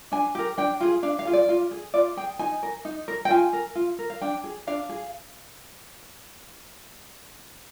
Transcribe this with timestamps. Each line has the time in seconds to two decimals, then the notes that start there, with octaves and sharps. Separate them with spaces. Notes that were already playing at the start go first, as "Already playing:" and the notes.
0.12 D4 G#5
0.35 G4 A#4
0.58 D4 G5
0.81 F4 G#4
1.03 D4 F5
1.19 F5
1.25 F4 G#4
1.33 D5
1.49 F4
1.71 G#4
1.94 F4 D5
2.17 G#4 G5
2.39 D#4 G#5
2.63 A#4
2.85 D#4
3.08 A#4
3.25 G5
3.30 F4 G#5
3.53 A#4
3.75 F4
3.99 A#4
4.10 F5
4.21 D4 G5
4.44 G#4
4.67 D4 F5
4.89 G#4